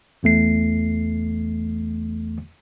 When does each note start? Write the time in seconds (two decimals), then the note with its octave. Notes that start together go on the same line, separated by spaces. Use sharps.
0.23 A1 E2 A3 C7